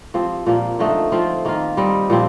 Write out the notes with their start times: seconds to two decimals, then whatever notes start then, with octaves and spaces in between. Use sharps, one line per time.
0.14 F3 C4 G4
0.47 A#2 F3 A#3
0.79 D3 F3 A3 D#4
1.12 F3 C4 F4
1.45 D#3 A#3 F4
1.77 G3 C4 D#4
2.10 A#2 F3 C4 G4